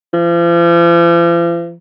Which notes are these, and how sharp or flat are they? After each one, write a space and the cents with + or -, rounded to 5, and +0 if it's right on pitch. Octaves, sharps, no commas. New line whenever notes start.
F3 -45